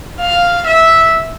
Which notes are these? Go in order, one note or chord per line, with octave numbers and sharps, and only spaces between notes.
F5
E5